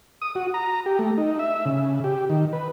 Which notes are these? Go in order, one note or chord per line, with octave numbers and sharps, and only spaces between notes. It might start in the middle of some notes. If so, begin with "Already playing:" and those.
D#6
F#4
A#5
G4
A3
D#4
E5
C#3
G4
D#3
B4